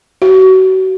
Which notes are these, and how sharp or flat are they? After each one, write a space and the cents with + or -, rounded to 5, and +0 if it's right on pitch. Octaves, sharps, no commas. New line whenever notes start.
F#4 +30